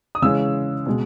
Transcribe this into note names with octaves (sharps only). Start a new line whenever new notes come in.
D#6
C#3 E3 G#3 C#4 E6
B2 G#3